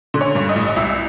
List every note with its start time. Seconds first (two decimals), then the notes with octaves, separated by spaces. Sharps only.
0.14 D3
0.21 C#5
0.35 G2
0.49 D#5
0.56 A1
0.67 D#5
0.76 C2 E5